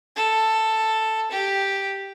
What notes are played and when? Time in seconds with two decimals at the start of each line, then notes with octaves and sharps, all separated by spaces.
0.16 A4
1.31 G4